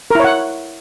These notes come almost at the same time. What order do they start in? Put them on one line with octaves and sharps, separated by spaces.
A#4 E4 C#5 F#5